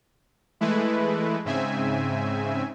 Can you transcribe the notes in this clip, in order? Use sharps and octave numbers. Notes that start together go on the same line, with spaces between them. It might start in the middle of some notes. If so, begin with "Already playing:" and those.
E3 G#3 A3 E4 B4
G#2 C#3 C4 E5 G#5